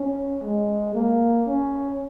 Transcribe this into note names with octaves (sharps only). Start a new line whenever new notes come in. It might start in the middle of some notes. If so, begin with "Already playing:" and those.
Already playing: C#4
G#3
A#3
C#4